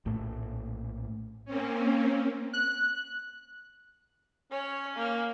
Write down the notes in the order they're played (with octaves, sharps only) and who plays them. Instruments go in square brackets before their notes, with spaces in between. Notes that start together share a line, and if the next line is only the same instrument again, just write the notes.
[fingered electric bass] A#1 A2 A3
[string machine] A#3 C4 C#4
[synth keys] F#6
[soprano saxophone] C#4 [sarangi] C#5
[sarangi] A#3